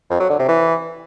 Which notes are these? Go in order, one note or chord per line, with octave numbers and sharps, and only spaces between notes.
F2
F#3
D3
C3
E3